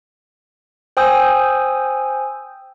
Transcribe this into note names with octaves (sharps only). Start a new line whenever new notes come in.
C5 G5 G#5 D#6 E6 G6